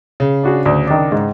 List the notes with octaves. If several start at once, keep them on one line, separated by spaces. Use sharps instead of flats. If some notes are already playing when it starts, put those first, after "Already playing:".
C#3
D4 F#4 G#4
D2
D#3 D4
G#2